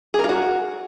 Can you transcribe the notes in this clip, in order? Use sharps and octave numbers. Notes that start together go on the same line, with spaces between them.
G#4
A#4
F4
F#4